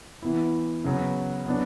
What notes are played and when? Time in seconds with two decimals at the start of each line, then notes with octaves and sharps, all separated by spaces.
0.22 E3 B3 E4
0.84 C#3 F#3 B3
1.46 F#3 B3 D4